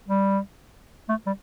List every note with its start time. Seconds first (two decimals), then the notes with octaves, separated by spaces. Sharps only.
0.08 G3
1.09 A3
1.26 G3